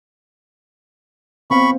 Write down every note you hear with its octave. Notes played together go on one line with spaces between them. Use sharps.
B3 C4 F5 B5 C#6